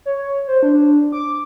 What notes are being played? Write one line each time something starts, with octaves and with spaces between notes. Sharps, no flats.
C#5
C5
D4
D6